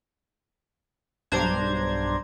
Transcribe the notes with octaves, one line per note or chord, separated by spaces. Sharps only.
B1 G2 D4 C5 A#5 G#6